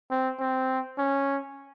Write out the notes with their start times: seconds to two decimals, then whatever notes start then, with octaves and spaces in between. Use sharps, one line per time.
0.11 C4
0.40 C4
0.98 C#4